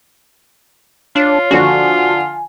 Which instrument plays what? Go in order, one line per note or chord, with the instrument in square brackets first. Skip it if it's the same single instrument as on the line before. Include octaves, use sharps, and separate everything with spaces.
[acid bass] D4 [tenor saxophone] F4 [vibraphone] C#5
[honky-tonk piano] D3 F3 D4 [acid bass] F#4 [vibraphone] G#5